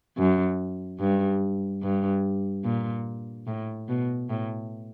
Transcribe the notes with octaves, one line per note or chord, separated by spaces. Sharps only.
F#2
G2
G2
A#2
A2
B2
A2